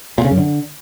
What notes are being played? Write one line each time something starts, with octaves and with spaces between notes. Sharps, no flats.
A#2
C#3
F#2
D3